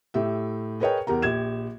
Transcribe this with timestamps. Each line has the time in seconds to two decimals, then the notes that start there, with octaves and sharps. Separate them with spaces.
0.14 A2 G4 E5
0.80 G#4 A#4 B4 C#5 D#5 G5
1.07 E2 G4 A#4 A#5
1.22 A#1 G4 G#6 E7